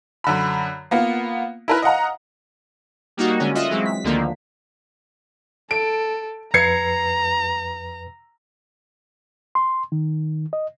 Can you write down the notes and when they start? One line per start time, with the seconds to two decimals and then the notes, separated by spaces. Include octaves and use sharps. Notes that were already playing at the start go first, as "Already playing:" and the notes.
0.24 F#2 D3 B5
0.91 A#3 B3 F4
1.68 E4 A#4 B4
1.82 D#5 F5 F#5 A#5
3.17 G3 A#3 D#4 F#4
3.40 D3 G#3 C#4
3.55 F4 D#5 E5 F#5
3.70 E3 F#3 G#3 C4
3.85 B6
4.04 D2 D3 D#3 F3 A#3
5.71 A4 D7
6.54 F2 B4 A#5 G#6 C7 C#7
9.55 C6
9.92 D#3
10.53 D#5